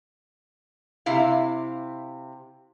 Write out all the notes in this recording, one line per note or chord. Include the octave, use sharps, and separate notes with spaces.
C3 E4 F5